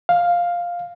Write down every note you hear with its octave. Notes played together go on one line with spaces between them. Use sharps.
F5